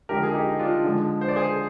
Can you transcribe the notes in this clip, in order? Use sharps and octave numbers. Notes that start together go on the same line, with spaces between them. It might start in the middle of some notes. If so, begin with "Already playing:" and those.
D3 F3 G#3 G4 A#4
G#4
D#4 G4
D4 F4
D3 F3 G#3
C5
D5
G#4 C5